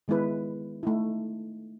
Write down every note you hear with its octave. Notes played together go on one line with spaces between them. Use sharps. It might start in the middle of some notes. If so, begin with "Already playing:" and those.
D#3 G#3 B3 E4 B4
A3 D#4 E4